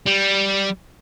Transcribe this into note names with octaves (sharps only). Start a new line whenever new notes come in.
G3